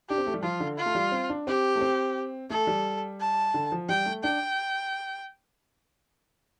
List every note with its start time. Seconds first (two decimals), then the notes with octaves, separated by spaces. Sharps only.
0.08 D4 G4
0.18 C4
0.27 A3
0.34 G3
0.43 F3 F4
0.60 D3
0.77 F4
0.86 A3
0.95 G3
1.12 C4
1.30 D4
1.47 C4 G4
1.76 A3
1.81 C4
2.50 A3 A4
2.67 G3
3.20 A5
3.54 D3
3.72 F3
3.88 G3 G5
4.06 A3
4.23 D4 G5